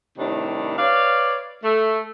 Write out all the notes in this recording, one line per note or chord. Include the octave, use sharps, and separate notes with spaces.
A2 C3 D#3 G3 D4
B4 C#5 D5 F5
A3